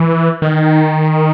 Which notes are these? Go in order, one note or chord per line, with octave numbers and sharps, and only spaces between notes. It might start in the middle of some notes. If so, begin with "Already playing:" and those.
Already playing: E3
D#3